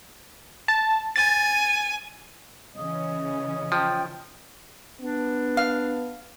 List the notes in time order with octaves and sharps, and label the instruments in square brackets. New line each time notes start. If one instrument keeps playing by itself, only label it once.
[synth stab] A5
[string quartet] G#5 [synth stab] A6
[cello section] C#3 E3 C#4 [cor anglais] D#5
[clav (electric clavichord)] F3 [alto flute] G5
[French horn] B3 [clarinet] D4
[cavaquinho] F5